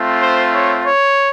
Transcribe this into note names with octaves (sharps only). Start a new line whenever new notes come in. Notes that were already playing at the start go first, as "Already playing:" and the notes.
Already playing: A3 C4 F4
C5
C#5
C#5